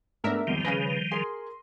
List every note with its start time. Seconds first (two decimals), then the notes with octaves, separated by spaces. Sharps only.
0.24 G#2 A3 B3 D4 A#4 E5
0.47 G#1 E2 D#3 F3 G3
0.65 C#3 G#4 B4 A#6 D#7
1.12 G#4 A#4 C6